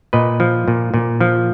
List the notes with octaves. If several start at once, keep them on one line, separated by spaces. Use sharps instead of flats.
A#2 B4 D#5
F3
A#2
A#2
F3